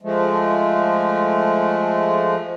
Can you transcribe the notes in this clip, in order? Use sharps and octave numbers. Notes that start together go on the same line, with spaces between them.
F3 G#3 A3